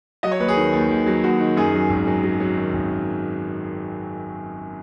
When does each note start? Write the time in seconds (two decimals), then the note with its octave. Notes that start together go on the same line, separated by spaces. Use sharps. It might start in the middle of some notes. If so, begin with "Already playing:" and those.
0.23 F#3 D#5
0.31 C#5
0.40 D#2 B4
0.48 G#4
0.57 D#3
0.73 D#2
0.91 D#2
1.06 F#3
1.24 D#2 F#4
1.40 D#3
1.57 F#2 G#4
1.74 F#3
1.90 G#1
2.07 F#3
2.23 F#3
2.40 F#3
2.57 D#3
2.74 G#1